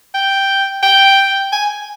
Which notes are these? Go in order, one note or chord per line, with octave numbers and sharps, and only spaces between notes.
G5
G5
G#5